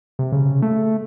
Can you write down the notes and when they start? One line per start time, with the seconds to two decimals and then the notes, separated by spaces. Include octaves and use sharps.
0.19 C3
0.32 C#3
0.62 A3